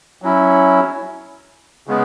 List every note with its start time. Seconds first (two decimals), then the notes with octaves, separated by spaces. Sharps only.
0.22 F#3 C#4 E4
1.87 C#3 G#3 B3